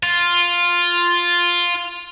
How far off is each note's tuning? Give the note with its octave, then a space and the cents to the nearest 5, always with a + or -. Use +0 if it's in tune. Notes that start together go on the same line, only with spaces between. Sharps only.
F4 +0